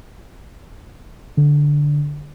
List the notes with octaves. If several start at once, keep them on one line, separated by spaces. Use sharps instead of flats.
D3